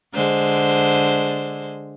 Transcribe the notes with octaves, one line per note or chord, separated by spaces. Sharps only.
D3 G#3 C5